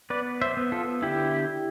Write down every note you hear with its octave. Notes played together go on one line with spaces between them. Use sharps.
B3 B4 D5
C5 E5
B3
F4 A4
D3 E4 G4